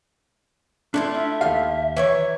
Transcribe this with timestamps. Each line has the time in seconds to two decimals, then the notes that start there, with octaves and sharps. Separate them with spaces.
0.94 A3 D4 E4 F4
1.14 E5
1.41 D#2 G4 F5
1.97 E3 F#3 C#5